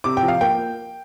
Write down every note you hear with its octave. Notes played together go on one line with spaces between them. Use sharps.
C3 D6
G5
F3
F5
A#3 G5